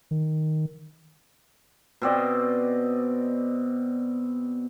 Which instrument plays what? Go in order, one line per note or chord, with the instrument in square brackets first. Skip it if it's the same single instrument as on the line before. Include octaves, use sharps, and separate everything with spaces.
[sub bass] D#3
[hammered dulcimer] B2 C4 D5 D#5